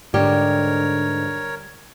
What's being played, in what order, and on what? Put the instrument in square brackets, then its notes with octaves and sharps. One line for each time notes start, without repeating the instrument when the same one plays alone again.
[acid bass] G#2 [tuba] D3 [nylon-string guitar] G3 G4 [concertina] A#4 C#5